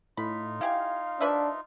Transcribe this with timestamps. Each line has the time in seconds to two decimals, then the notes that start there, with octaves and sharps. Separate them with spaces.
0.17 A2 D#4 F4 B5
0.61 E4 G4 F5 G#5
1.21 F3 D4 B4 E5